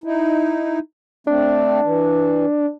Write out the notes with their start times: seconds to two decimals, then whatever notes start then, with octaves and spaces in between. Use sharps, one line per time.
0.04 D#4 E4
1.27 A3 C4 D4
1.83 E3